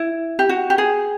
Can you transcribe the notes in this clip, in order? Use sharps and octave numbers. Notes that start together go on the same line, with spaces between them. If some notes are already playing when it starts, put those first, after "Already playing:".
Already playing: E4
G4
F#4
G4
G#4